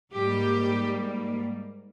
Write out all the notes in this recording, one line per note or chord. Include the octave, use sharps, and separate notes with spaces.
G#2 G3 A#3 G4